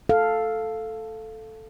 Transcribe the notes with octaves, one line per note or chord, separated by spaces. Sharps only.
A4 F5